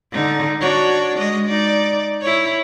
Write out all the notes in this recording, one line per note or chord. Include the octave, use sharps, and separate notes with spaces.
D3 D#4
D4 F#4 C#5
G#3 D#5
D#4 D5
E4 C#5